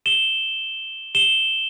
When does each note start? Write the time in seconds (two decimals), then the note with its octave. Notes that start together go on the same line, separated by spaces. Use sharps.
0.06 E7 G7
1.15 E7 G7